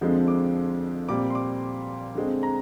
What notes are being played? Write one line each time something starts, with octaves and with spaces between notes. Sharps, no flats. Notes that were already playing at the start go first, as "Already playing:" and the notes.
F2 D3 F3 G#3 C4
D6
A#2 G3 C4 D6
C6
D6
D3 G#3 C4
A#5